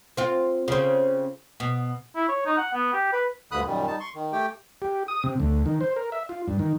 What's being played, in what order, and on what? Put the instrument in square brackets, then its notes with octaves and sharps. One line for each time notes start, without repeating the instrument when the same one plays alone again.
[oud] C4 F4
C#3 C4
B2
[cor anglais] E4
C#5
D#4
F#5
B3
G4
B4
[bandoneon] D2 G2 D3 B5 D#6 F#6
F#2 A#2 D#3 G3
G3 D#4 A5
C6 C#6
D#3
A3 G4 G5
[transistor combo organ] G4
D#6
C3
D2
D#3
C5
A#4
E5
F4
G2
D#3